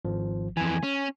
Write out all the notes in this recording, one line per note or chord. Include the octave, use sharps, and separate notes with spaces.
G#1 F3
F2 E3 G#5
C#4